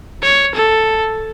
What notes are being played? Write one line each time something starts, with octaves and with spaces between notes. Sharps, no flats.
C#5
A4